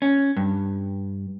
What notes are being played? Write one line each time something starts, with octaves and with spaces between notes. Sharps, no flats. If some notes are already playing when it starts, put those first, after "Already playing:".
C#4
G2